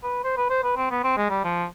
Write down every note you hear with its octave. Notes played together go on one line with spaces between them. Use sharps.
B4
C5
B4
C5
B4
C4
B3
C4
G#3
G3
F3